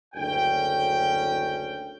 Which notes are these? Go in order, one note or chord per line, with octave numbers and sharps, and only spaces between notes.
F#1 D2 C#4 G5